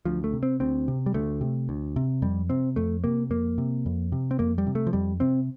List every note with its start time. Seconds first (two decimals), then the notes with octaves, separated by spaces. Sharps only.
0.05 D2 F3
0.24 A3
0.33 C3
0.43 C4
0.60 D2 C4
0.88 C3
1.06 G3
1.14 D2 A3
1.41 C3
1.69 D2
1.96 C3
2.22 F2 G3
2.50 C3 C4
2.76 F2 A3
3.04 C3 A#3
3.30 F2 A#3
3.58 C3
3.86 F2
4.12 C3
4.31 C4
4.39 F2 A#3
4.58 G3
4.67 C3
4.75 A3
4.87 F3
4.93 F2 G3
5.20 C3 C4